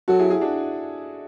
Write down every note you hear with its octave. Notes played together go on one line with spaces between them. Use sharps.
F#3 F#4 A4
E4 G#4
E4 G#4
D4 F#4